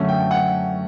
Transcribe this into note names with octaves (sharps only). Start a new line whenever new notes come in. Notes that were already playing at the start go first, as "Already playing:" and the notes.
Already playing: F#2 D3 A3 C#4
G5
F#5